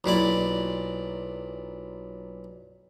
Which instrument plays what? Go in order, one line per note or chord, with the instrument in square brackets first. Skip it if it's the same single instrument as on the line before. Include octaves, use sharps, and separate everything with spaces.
[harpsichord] B1 A#2 E4 D5